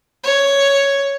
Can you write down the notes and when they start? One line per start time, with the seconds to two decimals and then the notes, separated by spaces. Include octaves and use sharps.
0.24 C#5